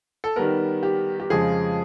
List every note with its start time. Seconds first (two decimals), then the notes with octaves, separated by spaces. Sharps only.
0.24 A4
0.36 D#3 G3 B3 A#4
0.83 G4
1.20 G4
1.30 F2 C#3 F3 G#3 G#4